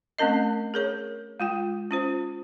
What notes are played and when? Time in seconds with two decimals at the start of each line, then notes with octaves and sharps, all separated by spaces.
0.19 A3 C4 C#4 A#4 D#5
0.74 G#4 A#4 C#5
1.40 G#3 F4 G5
1.91 C#4 F4 C5